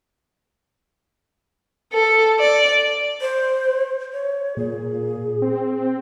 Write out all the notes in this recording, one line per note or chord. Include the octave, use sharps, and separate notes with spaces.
A4
D5
C5
C#5
A#2 G#4
C4